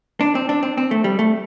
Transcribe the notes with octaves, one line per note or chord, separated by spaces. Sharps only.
D4
C4
D4
C4
C4
A3
G3
A3